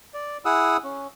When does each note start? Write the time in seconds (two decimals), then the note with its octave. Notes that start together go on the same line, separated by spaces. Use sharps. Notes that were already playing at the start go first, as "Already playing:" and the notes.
0.14 D5
0.45 E4 G#4 F#5 D#6 E6
0.84 C#4